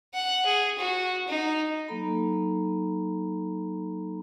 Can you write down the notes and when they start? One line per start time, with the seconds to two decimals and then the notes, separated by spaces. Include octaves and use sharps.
0.15 F#5
0.46 G#4
0.79 F#4
1.28 D#4
1.88 F#3 A#3 D#4 A4 A#5 B5